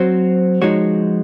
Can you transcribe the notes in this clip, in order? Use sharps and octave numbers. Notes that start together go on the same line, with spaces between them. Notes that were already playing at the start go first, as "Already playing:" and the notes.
Already playing: F#3 C4 F#4 C5
F3 G#3 D#4 F#4 C#5